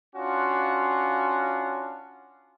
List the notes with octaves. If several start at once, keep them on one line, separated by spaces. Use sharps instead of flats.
C#4 D4 F4 F#4